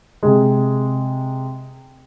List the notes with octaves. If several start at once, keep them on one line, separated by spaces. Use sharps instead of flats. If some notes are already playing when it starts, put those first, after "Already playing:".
C3 G#3